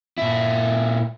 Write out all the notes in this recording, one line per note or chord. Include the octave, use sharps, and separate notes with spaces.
A#2 E4